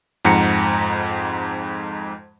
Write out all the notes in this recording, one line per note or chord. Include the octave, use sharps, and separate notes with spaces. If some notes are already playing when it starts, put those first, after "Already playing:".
F2 G#2 F#5 A#5 C#7